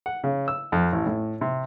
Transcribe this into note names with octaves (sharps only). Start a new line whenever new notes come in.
F#5
C#3
E6
F2
A1
A2
C3